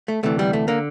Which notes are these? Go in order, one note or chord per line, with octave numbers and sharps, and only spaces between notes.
A3
D2 C3 E3 A3
G3
A3
D3 A#3